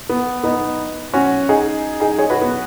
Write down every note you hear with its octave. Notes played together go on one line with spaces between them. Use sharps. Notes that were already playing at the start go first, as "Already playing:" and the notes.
B3
B3 D#4
C#4 F#4
D#4 G#4
D#4 G#4
G#4 C#5
F#4 B4
B3